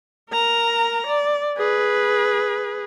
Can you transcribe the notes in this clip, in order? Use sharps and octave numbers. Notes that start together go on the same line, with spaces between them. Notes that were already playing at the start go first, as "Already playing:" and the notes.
A#4 A#5
D5
G#4 B4